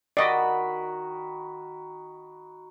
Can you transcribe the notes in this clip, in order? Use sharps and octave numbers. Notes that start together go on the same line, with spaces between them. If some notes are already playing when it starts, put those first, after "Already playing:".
D#3 F#4 D5 D#5 B5